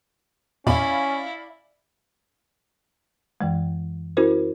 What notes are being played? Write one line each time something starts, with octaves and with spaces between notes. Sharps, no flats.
E2 A#2 C#4 E4 D5 F5 B5
F#2 E3 G#3
C#4 E4 F#4 A#4 C5